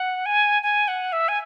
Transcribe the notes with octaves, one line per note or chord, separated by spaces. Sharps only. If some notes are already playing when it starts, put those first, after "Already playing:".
Already playing: F#5
G#5
G#5
F#5
E5
G#5